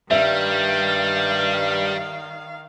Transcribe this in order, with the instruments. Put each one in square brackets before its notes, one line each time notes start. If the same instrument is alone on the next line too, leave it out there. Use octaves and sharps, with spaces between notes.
[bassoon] G2 [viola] D#3 F5 [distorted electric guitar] G3 [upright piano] E5